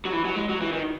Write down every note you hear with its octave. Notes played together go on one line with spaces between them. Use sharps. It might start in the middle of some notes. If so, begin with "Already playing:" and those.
F#3
E3
F#3
G#3
F#3
E3
D#3